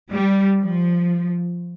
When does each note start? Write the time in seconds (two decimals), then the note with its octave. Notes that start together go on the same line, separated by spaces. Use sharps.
0.11 G3
0.59 F3